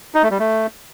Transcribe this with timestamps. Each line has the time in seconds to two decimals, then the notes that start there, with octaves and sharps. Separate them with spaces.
0.15 D#4
0.23 A3
0.31 G3
0.39 A3